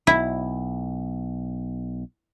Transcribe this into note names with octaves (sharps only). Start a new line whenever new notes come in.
B1 E4